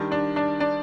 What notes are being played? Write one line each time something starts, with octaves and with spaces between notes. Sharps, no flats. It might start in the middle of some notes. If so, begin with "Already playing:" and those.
Already playing: D#3 G3 D4
D4 D5
D4 D5
D4 D5